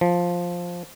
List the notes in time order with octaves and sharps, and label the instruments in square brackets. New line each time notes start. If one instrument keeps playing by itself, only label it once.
[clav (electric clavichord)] F3